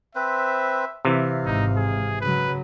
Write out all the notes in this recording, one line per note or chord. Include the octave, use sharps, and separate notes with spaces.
C4 B4 C5 E5
C3 E3 F5
G#1 G#2 D#4
G#4
C#3 F#3 B4